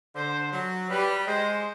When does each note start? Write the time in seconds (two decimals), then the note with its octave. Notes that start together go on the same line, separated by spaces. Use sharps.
0.16 D3 C5
0.53 F#3
0.90 G3 B4
1.27 G#3 C5